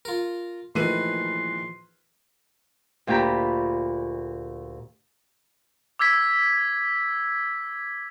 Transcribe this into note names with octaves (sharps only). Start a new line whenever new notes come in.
F4 A#4
A#1 D#3 E3 A3 B4 C6 D#7
D2 A#2 F4 G4 A#5 B5
D6 E6 G#6 B6